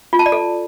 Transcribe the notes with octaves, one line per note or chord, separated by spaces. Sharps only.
F4
A5
D5
A4